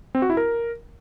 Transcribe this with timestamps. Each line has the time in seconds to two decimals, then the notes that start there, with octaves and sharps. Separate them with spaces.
0.15 C4
0.22 F#4
0.30 E4
0.37 A#4